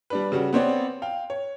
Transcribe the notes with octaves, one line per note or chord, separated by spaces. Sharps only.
G3 D4 B4
C#3 G3 F#4
B3 C4 C#5 D5
F5 G5
C#5